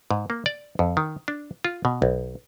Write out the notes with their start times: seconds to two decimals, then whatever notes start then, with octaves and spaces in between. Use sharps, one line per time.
0.11 G#2
0.30 A#3
0.46 D5
0.79 F2
0.97 D#3
1.28 D4
1.65 F4
1.85 B2
2.02 B1